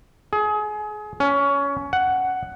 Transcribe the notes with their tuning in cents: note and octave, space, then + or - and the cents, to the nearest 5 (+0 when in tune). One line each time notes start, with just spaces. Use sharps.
G#4 +30
C#4 +20
F#5 +5